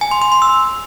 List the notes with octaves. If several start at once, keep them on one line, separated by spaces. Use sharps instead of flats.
G#5
C6
C6
C6
E6